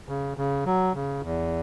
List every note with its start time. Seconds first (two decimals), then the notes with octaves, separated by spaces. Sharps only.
0.09 C#3
0.37 C#3
0.66 F#3
0.94 C#3
1.23 E2